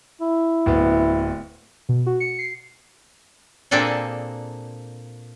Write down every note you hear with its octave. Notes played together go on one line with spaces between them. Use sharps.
E4
D1 B3
B2
F#4
C#7
C7
A#2 A#3 C4 D4 G#4 A4